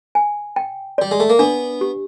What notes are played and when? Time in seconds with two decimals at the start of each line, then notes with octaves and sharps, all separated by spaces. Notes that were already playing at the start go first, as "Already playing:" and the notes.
0.15 G#5
0.56 G5
0.98 G3 D5
1.11 G#3
1.20 A3
1.30 A#3
1.39 B3 D4
1.81 G4